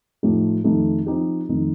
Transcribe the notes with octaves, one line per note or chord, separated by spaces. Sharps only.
A2 F3 A3 D#4 G4
F2 D#3 A3 D#4 G4
F3 C4 D#4 G4
F2 C3 D#3 A3 D#4